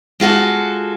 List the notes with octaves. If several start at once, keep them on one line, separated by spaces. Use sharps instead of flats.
G#3 F4 F#4 A4